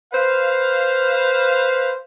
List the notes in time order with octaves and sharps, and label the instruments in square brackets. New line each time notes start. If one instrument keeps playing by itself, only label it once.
[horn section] B4 C5 F5